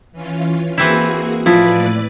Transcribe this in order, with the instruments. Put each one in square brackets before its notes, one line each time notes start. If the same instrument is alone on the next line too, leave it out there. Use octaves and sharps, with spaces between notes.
[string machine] E3 C#4 F4
[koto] E3 C4 E4 [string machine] A#3 F#4 G#4
[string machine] A2 B4 D5 [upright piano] F3 [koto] E4